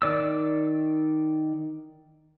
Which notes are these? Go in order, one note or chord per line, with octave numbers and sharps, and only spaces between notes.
D#3 D5 E6